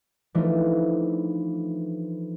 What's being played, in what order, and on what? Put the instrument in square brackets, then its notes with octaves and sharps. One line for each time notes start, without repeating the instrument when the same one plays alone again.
[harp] E3 F3 A3 D4 D#4 F4